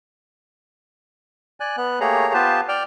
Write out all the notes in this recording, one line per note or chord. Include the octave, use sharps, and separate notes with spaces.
D5 G#5 F#6
B3 F#6
A3 A#3 G4 G#4 C#5 A#5
B3 F4 G4 B4 C5 A5
D5 G5 F6